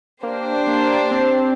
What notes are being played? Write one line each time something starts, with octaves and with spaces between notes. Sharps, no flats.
A#3 D4 G4 C5
A#3
C4